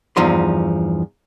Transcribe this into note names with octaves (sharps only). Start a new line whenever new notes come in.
E2 G2 F3 D#4 C6